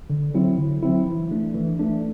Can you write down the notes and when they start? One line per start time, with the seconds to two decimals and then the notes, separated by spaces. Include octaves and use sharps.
0.10 D3
0.34 F#3 C4 E4
0.57 D3
0.82 F#3 C4 E4
1.07 E3
1.31 A3 D4
1.55 E3
1.79 A3 D4